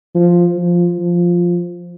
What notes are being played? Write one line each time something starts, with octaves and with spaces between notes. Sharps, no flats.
F3
F3
F3